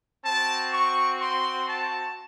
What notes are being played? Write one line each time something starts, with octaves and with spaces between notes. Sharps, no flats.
C4 F#4 A5
C#6
C6
A5